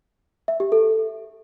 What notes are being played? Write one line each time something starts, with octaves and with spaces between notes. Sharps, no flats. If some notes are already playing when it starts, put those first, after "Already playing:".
E5
G4
A4